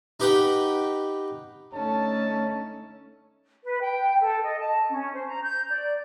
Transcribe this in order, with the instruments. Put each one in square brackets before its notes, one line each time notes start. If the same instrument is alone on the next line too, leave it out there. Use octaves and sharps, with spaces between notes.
[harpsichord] D#4 G4 B4 F#5 G5
[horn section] D3 D#4 A5 [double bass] A3 C#4
[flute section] B4
G5
A4
D#5
A5
C#4
C5
A#5
G6
D5